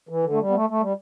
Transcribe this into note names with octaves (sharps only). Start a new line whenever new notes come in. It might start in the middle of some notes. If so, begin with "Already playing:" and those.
E3
D3
A3
G3
B3
A3
A3
G3